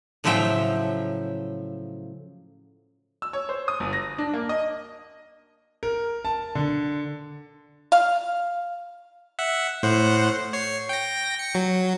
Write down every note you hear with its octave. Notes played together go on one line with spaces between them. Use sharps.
A2 C#3 F3 F#3 E5 G5
E6
C#5
C5
D#6
G1
A#6
D4
A#3
D#5
A#4
A5
D3
F5
E5 F#5
A2 C5 F#5
C#5 C7
G5 A#6
C#7
F#3